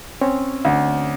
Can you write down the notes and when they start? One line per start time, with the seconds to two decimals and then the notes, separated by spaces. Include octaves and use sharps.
0.21 C4 C#4 C#5
0.65 D2